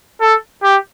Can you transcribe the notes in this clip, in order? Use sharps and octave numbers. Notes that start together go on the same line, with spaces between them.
A4
G4